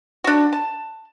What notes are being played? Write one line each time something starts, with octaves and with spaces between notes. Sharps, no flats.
D4 F#4
A5